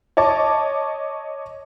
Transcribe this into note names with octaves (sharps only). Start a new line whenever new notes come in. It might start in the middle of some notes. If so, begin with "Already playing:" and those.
C#5 D#5 A5 D6